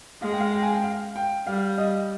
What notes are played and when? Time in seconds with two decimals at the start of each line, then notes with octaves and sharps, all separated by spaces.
0.22 G#3 F5
0.31 G5
0.40 F5
0.53 G5
0.63 G#5
0.72 G5
0.84 F5
1.16 G5
1.47 G3 F5
1.78 D#5